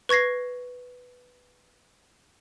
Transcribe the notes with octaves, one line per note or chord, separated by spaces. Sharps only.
B4 C#6 G#6 A#6 C7